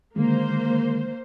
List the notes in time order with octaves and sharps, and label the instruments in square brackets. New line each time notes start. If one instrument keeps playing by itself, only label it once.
[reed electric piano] D3 D#3 G#3 [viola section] A#3 C5